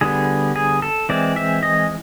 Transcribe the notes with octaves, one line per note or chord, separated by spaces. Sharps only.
D3 G3 B3 G#4
G#4
A4
E3 G#3 C4 D5
E5
D#5